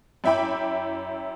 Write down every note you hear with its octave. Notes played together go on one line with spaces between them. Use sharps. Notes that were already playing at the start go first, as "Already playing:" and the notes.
F#2 E4 E5 G5 B5 D6